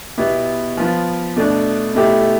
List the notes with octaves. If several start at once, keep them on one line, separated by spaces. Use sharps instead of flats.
B2 B3 E4 G4
F3 B3 F4
B2 A3 D4
B2 A3 E4 G4